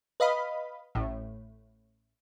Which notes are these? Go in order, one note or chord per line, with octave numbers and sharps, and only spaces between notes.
B4 D#5 F5 B5
A1 A2